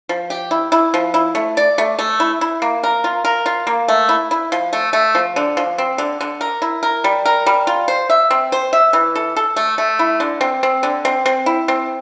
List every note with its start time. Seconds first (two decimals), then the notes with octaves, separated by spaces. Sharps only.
0.09 F3
0.30 G4
0.51 E4
0.72 E4
0.94 F3
1.14 E4
1.35 A3
1.57 D5
1.78 A3
1.99 A3
2.20 E4
2.41 E4
2.62 A#3
2.83 A#4
3.04 F4
3.25 A#4
3.46 F4
3.67 A#3
3.88 A3
4.09 E4
4.31 E4
4.52 F3
4.73 A3
4.93 A3
5.15 F3
5.36 D3
5.57 F3
5.78 C4
5.98 D3
6.21 D3
6.41 A#4
6.62 E4
6.83 A#4
7.04 G3
7.25 A#4
7.46 G3
7.67 F4
7.88 C5
8.10 E5
8.31 C4
8.52 C5
8.73 E5
8.93 E3
9.15 A4
9.36 A4
9.56 A3
9.78 A3
9.99 E4
10.20 D3
10.41 C4
10.63 C4
10.83 D3
11.05 C4
11.26 C4
11.46 E4
11.68 C4